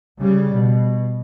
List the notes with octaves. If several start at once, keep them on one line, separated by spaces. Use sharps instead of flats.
C#3 G3
B2